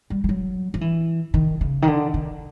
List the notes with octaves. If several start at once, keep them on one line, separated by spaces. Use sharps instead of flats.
G3
G3
F#3
F3
E3
D#3
C#3
D#3
D3
D#3